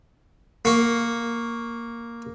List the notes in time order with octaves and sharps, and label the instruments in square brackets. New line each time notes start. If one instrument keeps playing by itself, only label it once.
[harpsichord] A#3 C#6